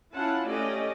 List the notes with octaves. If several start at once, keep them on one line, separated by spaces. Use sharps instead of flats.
C#4 E4 F4 F#5 A5
A3 C#4 G4 D5 D#5